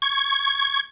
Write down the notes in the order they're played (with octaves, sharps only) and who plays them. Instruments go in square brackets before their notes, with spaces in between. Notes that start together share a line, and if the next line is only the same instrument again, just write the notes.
[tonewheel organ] C#6 G#6